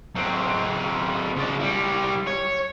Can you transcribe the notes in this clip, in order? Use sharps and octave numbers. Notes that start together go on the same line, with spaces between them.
F#3 C4
C#3 D5
G3 E4
C#5